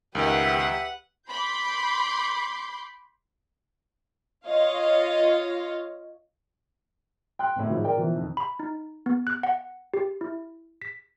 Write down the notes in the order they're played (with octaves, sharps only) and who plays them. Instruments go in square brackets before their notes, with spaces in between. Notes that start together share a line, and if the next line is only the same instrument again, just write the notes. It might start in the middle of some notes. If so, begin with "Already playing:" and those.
[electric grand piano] C#2 D#3 [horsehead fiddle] G4 E5 [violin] B4 F#5
[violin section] B5 C6 D6 G6
[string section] F4 C#5 D#5 F5
[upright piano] G5 C6 F#6
G#1 A2
G#2 D#3 F3 F#3
A#4 D5 G5
B2 E3 F3
F2 D#3
[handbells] B5
D#4
B3
F#6
F#5
G4
E4
B6